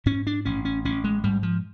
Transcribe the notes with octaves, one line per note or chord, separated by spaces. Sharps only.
G#2 C#4
D4
A1 C#4
C#4
A1 C#4
G#3
G#2 G3
F3